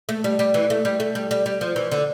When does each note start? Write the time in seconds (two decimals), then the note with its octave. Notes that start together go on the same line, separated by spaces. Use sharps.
0.09 A3
0.24 G3
0.39 G3
0.54 E3
0.70 A3
0.85 G3
1.00 A3
1.15 G3
1.31 G3
1.46 G3
1.61 F3
1.76 E3
1.92 D3